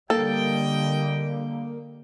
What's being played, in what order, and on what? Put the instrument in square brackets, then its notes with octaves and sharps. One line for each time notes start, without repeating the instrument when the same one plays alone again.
[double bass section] D3 G3 [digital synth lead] A#3 [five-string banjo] A4 [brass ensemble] D#5 G5